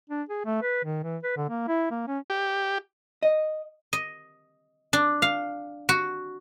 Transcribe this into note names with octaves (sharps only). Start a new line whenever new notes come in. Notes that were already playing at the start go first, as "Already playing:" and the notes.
D4
G#4
A3
B4
D#3
E3
B4
D3
A#3
E4
A#3
C#4
G4
D#5
D#5
D4
F5
F#4